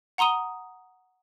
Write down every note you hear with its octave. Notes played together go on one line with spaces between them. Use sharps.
F#5 A#5 C6 D#6 D#7